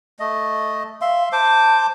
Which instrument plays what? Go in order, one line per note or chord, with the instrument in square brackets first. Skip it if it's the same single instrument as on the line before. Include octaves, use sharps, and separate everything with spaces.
[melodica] A3 D#5
[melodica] E5 C6 [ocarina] F5
[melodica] C5 D6 [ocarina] A5